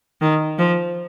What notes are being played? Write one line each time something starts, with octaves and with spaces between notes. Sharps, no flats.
D#3
F3